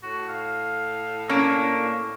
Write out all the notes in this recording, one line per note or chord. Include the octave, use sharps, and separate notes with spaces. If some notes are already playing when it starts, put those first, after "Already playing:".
A2 F#4
F5
A#3 C#4 D4